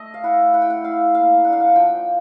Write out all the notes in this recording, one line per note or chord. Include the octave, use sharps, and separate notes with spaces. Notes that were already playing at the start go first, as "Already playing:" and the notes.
Already playing: A3 D#5
F5
E4 F#5
E4 F#5
G5
F#5
E4 F5
A#3 F5
D4 F#5
F5
F#5
F3 G5